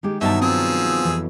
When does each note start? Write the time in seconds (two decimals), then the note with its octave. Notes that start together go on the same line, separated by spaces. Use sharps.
0.03 D#3 G#3 G4
0.21 G2 B2 D#3 F#3 D#4 E5 A5
0.42 F3 C4 G#4 E6
1.05 F2 E3